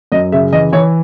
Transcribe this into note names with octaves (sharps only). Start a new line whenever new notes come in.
F#2 D#5
C#3 E5
E3 D#5
E3 C#5